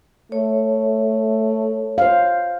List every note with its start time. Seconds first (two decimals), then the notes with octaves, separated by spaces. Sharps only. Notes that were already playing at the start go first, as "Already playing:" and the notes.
0.32 A3 C#5
1.98 C5 F5